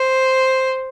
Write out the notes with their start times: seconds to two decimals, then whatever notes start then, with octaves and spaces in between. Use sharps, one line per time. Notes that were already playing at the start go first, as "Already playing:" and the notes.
Already playing: C5